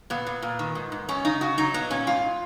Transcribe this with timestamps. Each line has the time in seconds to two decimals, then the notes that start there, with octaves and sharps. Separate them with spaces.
0.10 A#2 B3
0.27 A#2
0.42 A#2
0.59 D#3
0.75 G#2
0.92 G#2
1.08 F#2 C#4
1.25 C#3 D#4
1.41 C#3 F#4
1.58 F#3 D#4
1.74 A#2 B3
1.91 A#2 C#4
2.07 G#2 F4